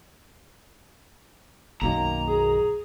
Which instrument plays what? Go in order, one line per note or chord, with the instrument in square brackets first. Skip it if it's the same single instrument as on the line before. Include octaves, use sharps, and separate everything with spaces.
[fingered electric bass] B1 F#2 D#3 [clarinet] A#3 [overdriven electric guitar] A#5
[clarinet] G#4